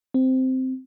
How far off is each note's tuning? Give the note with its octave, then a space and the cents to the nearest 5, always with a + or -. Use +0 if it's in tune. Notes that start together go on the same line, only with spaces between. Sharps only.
C4 -10